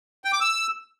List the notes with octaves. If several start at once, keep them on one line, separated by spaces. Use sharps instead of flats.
G5
D6
E6